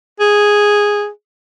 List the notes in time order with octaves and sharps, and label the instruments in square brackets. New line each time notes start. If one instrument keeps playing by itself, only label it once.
[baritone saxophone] G#4